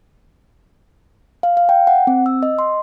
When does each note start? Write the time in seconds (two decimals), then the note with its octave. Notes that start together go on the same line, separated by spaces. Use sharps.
1.43 F5
1.57 F5
1.69 G5
1.87 F#5
2.07 C4
2.26 E6
2.43 D#5
2.59 C6